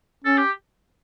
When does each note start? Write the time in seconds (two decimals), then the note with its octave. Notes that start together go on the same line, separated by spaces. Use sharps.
0.25 C#4 A4
0.38 G4